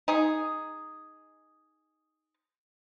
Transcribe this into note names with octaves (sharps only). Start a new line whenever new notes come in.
D#4 G#4